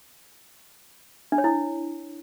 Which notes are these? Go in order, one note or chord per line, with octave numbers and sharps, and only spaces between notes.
D4
C#5
E4